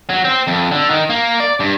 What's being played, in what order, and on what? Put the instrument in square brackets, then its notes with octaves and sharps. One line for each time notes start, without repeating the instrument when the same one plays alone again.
[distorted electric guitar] F#3
C4
F2
D3
D#3
A#3
D5
G2